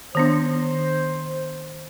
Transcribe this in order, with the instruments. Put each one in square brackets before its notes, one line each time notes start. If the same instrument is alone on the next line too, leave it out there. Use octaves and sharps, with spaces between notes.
[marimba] D#3 B3 D4 [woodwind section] C5